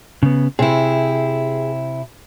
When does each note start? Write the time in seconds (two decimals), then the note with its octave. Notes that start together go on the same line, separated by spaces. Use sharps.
0.23 C#3 B3
0.59 C3 E4 G#4